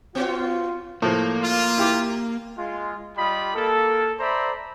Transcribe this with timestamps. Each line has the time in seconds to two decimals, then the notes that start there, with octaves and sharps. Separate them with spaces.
0.15 B3 F4 F#4 C#5
1.02 A2 F3 A#3
1.42 F4
1.78 E4 G4 D6
2.58 G#3 F4
3.17 G3 F4 D#5 B5
3.55 A#3 A4
4.20 C5 D5 E5 A#5 B5